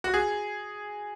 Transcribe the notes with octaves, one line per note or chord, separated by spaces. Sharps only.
F#4
G#4